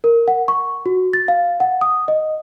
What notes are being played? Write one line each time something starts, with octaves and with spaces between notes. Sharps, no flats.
A#4
F#5
C#6
F#4
A6
F5
F#5
D#6
D#5